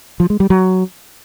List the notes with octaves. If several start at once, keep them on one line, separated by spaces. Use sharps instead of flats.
F3
G#3
G3
F#3